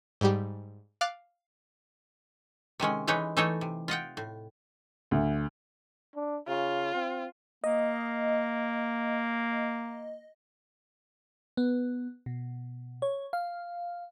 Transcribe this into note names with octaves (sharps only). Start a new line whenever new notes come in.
G#2 G3 G4
F5 D6 F#6 A6
C3 D#3 G#3 C#4
E3 G#3 D#4 B4 C#5
E3 A3 D#4 A4 C#5 D#5
C3
F4 D#5 F#5 G5
A2
D2
D4
C#3 F4
C4
A#3 D#5
B3
B2
C#5
F5